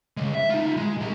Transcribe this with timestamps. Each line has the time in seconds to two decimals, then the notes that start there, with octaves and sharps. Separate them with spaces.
0.17 C#3 G#3
0.35 E5
0.50 D#4 F4
0.77 G#3
0.97 C2 G4